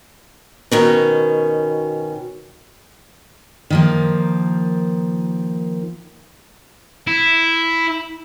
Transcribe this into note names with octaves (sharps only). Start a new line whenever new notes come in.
B2 D#3 C#4
D#3 F3 A#3
E4